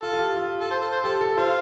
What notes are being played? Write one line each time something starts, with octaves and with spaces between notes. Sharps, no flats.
F4 A4
F4
G4
F4
A4
C5
A4
C5
G4 A4
A4
F4 C5